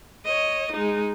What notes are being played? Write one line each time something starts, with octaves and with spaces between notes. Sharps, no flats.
C#5 D#5
G#3 D#4